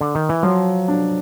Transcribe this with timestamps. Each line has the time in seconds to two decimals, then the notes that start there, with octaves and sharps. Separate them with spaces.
0.01 D3
0.15 D#3
0.29 E3
0.43 F3 F#3
0.88 D4